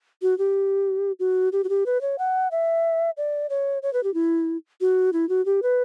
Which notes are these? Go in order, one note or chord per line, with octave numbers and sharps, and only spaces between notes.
F#4
G4
F#4
G4
F#4
G4
B4
C#5
F#5
E5
D5
C#5
C#5
B4
G4
E4
F#4
E4
F#4
G4
B4